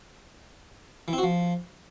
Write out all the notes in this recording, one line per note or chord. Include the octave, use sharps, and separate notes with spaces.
E3
C4
F#4
F3